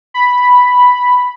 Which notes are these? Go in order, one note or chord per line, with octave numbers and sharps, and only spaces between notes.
B5